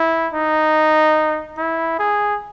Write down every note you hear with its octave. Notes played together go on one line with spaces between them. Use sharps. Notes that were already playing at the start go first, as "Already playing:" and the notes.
Already playing: E4
D#4
E4
G#4